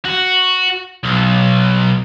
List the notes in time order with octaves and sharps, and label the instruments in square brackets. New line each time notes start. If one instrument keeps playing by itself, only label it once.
[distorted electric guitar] F#4
B1